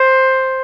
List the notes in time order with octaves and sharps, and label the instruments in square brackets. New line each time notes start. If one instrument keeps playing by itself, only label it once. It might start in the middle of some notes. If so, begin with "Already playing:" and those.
Already playing: [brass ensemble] C5